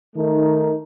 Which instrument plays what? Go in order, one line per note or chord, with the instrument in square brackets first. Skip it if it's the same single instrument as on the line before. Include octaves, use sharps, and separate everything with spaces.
[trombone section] D#3 A3 D#4 A#4